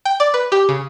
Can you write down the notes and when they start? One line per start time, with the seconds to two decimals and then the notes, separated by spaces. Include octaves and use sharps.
0.05 G5
0.20 D5
0.34 B4
0.52 G4
0.69 C#3